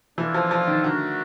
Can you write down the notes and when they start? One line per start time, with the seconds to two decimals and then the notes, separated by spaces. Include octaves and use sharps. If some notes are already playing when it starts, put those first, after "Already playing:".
0.18 E3 A#3 D4 F4 A4 D5
0.34 F3
0.51 F3
0.68 D#3
0.84 D3 A3 D4 F#4 A#4